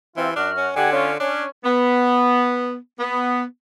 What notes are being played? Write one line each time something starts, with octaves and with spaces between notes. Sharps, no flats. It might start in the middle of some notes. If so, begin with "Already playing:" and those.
C3 E3 C4 F4
F#2 D4 F#4 F6
C#4
D3 G4 F#5 G#5
C#4 F4
C#4 D4
B3
B3